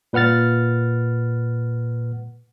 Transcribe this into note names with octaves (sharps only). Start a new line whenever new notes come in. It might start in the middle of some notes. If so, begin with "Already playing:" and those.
A#2 B4 F#5 F6 A6